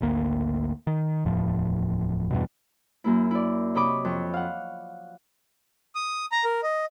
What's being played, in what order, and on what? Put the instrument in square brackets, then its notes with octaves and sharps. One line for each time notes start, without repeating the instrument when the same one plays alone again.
[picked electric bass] G#1 D2 A#3
D#3
D1 E2 A2 F3
E2 G2 B2
[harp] F#2 A#3 E4
E4 D5
C3 C#5 D#5 B5 D6
F2 C#6
F5 F#5
[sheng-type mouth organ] D#6
A#5
A#4
D#5